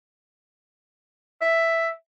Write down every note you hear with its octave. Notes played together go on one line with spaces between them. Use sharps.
E5